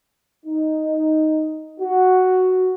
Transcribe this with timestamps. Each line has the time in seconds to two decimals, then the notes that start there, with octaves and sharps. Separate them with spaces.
0.46 D#4
1.81 F#4